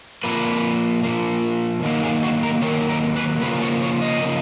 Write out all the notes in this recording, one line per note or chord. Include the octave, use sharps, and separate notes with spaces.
A#2 F3 A#3 B4
A#2 F3 A#3
D#3 F#3 A#3
G#4
F#4
A#4
D#3 F#3 A#3 C#5
A#4
B4
C#3 F3 A#3 B4
C#5
C#5
D#5
C#3 F3 A#3